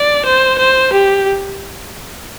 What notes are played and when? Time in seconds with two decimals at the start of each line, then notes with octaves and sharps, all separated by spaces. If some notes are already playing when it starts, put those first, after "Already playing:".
Already playing: D5
0.25 C5
0.59 C5
0.93 G4